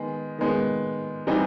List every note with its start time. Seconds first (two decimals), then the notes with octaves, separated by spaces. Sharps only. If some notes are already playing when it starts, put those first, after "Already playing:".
Already playing: D#3 G#3 B3
0.39 D#3 G#3 B3
1.27 E3 G3 C4 D#4